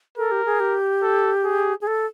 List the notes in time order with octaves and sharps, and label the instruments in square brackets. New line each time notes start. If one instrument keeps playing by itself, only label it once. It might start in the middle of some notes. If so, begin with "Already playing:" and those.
[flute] A4 [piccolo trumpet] A#4
[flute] G4
G#4
G4
[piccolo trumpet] A4
G#4
[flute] G#4
A4